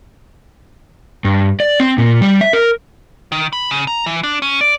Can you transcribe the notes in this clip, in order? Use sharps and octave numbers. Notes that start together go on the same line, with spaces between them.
G2
D5
C4
A#2
G3
E5
A#4
D#3
B5
C#3
A#5
E3
D4
C#4
D5